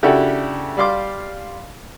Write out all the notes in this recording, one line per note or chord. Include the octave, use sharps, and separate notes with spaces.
C#3 D4 E4 F#4 G4 A4
G3 D5 F5 C6 D6